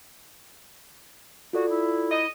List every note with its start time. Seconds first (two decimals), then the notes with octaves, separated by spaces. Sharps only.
1.53 F4 F#4 A4 D5
1.69 E4
2.11 D#5